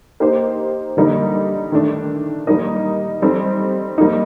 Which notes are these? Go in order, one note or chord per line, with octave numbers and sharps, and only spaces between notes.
A#3 D#4 G4 C5
D3 G3 A#3 D#4
D#3 A3 D4
G3 A#3 D#4 A#4 D#5
G3 C4 D#4 A4
G3 A#3 D#4